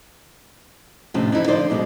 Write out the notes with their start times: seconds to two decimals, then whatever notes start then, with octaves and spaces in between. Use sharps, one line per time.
1.14 F2 A2 C3 F3 C#4 D4
1.32 F2 D#4 E4
1.48 D3 F3 D#4 C5 D5
1.70 F#2 B2 D3 G#3